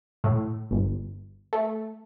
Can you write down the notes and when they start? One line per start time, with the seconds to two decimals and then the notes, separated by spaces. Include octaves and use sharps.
0.24 A2
0.71 G1
1.53 A3